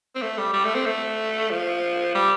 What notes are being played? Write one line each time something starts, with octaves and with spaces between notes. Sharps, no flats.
C4
A3
G3
G3
A3
C4
A3
F3
G3